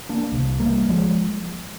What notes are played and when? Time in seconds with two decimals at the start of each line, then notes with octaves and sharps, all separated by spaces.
0.09 A#3 D4
0.32 C2 C3
0.60 G3 A#3
0.89 F3 G#3